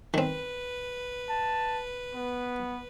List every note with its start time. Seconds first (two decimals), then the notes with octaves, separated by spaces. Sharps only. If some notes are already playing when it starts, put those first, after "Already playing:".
0.14 D#3 C4 B4
1.29 A5
2.14 B3